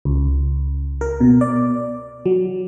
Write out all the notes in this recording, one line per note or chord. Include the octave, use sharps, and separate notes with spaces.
C#2
A#4
B2
D5
F#3